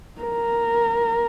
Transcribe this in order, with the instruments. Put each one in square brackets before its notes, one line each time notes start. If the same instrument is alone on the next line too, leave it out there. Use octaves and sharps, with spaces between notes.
[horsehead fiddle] A#4